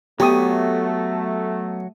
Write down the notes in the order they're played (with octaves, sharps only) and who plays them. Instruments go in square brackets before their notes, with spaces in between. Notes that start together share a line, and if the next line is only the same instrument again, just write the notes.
[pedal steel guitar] F#3 C#6 [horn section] A3 [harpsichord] B3 [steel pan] G4 D#6